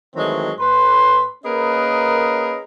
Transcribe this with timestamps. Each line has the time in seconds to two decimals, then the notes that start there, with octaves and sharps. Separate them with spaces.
0.16 D#3 E3 F#3 G#3 A3 C4
0.59 A2 B4 C6
1.44 A#3 C#4 G#4 A#4 B4 D#5